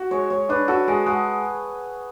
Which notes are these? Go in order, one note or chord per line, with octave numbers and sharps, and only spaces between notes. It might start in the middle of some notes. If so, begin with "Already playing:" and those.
Already playing: F#4
G#3 C#5
G#3 C#5
D4 B4
F#4 A4
G#3 G#4
G#3 F#4